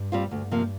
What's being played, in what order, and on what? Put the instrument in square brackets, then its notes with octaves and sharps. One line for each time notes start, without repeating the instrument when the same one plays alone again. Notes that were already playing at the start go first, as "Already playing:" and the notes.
Already playing: [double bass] G2
[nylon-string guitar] G3 C4 F4
[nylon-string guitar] D2 [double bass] G2
[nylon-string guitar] C3 F3 A#3